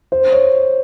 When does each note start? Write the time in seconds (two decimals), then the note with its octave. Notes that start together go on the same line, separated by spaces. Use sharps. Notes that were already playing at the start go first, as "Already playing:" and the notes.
0.12 C5
0.32 C#5